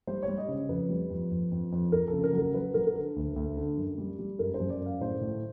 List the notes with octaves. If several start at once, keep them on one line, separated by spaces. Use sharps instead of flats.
G3 C5
C#5
G3
D#5
C#3
F2 B4
G3
F2
F2
F2
F2
F2 A#4
A4
C#3
A#4
F#3
A#4
F#3 B4
F#3 A#4
A#4
D3 A4
D2
D2
D3
F#2
G3
G3
F#2 A#4
C5
F#2
D5
F#2
F5
A2 C5
A2